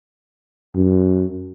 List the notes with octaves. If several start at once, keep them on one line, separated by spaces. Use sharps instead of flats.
F#2